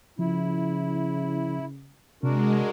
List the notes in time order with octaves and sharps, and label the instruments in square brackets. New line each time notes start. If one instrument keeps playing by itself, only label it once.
[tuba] C#3 [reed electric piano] F3 [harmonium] E4
[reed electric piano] C3 [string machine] G#3 [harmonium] D4 F#4 A#4